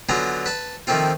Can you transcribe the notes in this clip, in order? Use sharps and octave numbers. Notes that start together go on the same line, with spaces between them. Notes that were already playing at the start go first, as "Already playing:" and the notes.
D3 F#3 B3 F4 G#5 A#5
B4 A5
D#3 F3 A3 A#3 C4 F4